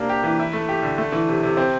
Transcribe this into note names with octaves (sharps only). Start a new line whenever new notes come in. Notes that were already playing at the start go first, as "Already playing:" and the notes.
Already playing: C3 A#3 D4
G4
E3
E4
A3
G4
D3
A3
E3
C3
C3
C4